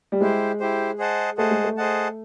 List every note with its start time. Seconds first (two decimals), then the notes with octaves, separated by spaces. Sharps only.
0.12 G3
0.21 G#3 E4 G4 C5
0.60 E4 G4 C5
0.99 G#4 C5 D#5 F#5 A5
1.38 A3 G#4 C5 D#5 F#5 A5
1.51 G#3
1.64 A3
1.77 G#4 C5 D#5 F#5 A5